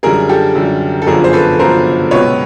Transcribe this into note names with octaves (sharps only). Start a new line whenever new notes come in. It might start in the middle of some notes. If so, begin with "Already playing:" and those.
F#2 D3 G3 G#4 A#4
G4 A4
F#2 D3 G3
A4
G1 F#2 D3 F3 G#4 A#4
C5
A4 B4
G1 F#2 D3 F3 A#4 C5
C#2 B2 F#3 B3 B4 C#5